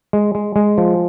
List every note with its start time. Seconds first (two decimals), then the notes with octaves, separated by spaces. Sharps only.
0.13 G#3
0.35 G#3
0.56 G#3
0.78 F3